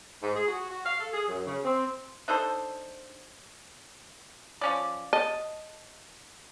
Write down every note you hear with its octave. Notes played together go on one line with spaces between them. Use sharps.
G#2
G#4
F#4
F#4
F5
A4
G#4
F#2
C#3
C4
D4 D#4 A4 C5
F3 C#4 D5
D#5 A5